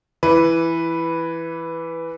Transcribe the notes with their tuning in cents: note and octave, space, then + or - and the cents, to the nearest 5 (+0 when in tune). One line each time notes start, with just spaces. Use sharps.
E3 +10 B4 +0